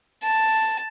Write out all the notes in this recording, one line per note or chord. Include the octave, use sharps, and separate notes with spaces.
A5